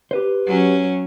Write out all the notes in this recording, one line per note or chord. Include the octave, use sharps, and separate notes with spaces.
G4 B4 C5
F#3 C#4